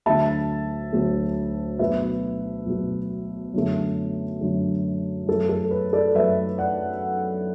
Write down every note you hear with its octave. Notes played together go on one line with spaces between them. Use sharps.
D2 D3 F#3 A3 E5 A5
D2 D3 F#3 A3
B1 B2 A3 B4 E5
B1 B2 A3
F#2 D3 A3
F#2 D3 A3
F#2 E3 A3 A4
A4
B4
A4 D5
F#2 E3 A3 B4 E5
D5 F#5